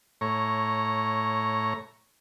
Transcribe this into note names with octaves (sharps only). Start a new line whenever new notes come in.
A2 C#5 A#5